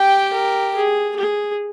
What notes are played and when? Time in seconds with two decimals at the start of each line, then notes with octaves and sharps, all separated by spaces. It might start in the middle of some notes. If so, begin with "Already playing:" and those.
Already playing: G4 G5
0.34 A#4
0.75 G#4
1.16 G#4